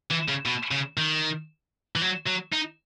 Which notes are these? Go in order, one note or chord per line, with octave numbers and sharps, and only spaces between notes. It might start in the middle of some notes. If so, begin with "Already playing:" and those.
E3
C#3
B2
C#3
D#3
E3
F#3
F#3
D#4